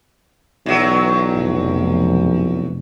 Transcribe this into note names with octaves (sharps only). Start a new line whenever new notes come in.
B1 E2 F#3
F1